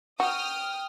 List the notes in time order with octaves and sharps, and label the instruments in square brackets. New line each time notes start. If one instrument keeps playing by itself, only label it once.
[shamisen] F#4 [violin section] G5 D#6 F6